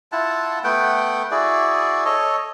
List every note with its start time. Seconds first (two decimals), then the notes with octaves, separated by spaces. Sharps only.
0.12 E4 F4 F#5 A5
0.64 A3 B3 F#5 G5
1.31 E4 F#4 G#4 D5
2.05 A4 C#5 D#5